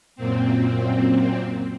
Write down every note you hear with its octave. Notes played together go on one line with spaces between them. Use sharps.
F#2 A#2 C4